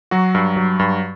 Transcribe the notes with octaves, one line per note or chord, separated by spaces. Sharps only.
F#3 F#4
G2
F#3
G2